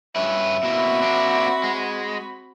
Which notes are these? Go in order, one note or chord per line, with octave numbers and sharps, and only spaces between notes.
G2 C#4 B4 E5
B2 A#3 C4 E4 F#4 B5
A#3 D4
G#3